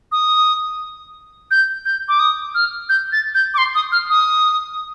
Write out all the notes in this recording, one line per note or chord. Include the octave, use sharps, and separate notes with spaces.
D#6
G6
G6
D6
D#6
F6
G6
A6
G6
D6
C6
D#6
F6
D#6